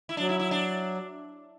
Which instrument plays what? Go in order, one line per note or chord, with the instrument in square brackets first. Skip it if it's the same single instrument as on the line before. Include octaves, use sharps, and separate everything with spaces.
[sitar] E4
[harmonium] F#3 [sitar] D4
[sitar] E4
E4
D4